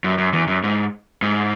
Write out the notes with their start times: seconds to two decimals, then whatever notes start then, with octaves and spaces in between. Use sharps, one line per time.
0.04 F#2
0.18 F#2
0.33 E2
0.48 F#2
0.64 G#2
1.22 G#2